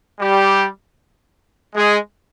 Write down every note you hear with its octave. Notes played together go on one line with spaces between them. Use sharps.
G3 G4
G#3 G#4